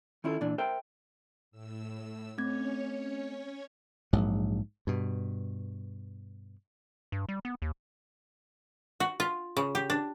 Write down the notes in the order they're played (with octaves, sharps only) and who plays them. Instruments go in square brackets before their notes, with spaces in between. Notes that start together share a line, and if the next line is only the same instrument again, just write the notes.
[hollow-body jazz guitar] D#3 C#4 E4 F4 A4
A#2 E3 D4
A#4 C5 E5 G5
[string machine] A2 E6
[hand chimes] A3 C4 G#6 [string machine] C#4 C#5
[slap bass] A#1 G#2 F#3
G2 B2
[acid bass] G2
G3
B3
D#2
[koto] F#4
F4
C#3
G4
D4